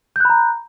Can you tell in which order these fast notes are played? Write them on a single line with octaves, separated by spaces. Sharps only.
G6 F#6 B5 A#5